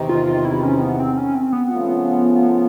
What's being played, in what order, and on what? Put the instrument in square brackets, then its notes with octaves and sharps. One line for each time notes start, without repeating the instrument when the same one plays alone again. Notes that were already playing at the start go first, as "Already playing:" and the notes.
Already playing: [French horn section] E2 C3 D#3
[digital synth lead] F4
F4
E4
C#4
B3
C4
C#4
C4
B3
[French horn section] C#3 F3 A3 C#4 F4